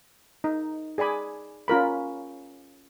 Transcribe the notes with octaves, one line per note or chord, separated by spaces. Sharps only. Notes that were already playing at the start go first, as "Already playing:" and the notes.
D#4
G#4 D5 G#5 B5 D6
C#4 F4 A#4 B5